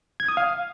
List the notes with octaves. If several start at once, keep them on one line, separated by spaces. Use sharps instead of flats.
G#6
D#6
F5